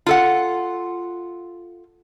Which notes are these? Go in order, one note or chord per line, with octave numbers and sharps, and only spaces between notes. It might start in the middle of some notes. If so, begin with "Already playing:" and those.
F4 A4 F#5